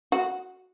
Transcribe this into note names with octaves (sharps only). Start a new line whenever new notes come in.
F#4